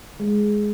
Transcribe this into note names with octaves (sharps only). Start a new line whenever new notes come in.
G#3